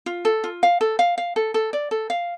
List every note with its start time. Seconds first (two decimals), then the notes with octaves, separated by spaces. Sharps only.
0.06 F4
0.25 A4
0.44 F4
0.63 F5
0.81 A4
0.99 F5
1.18 F5
1.36 A4
1.54 A4
1.73 D5
1.91 A4
2.10 F5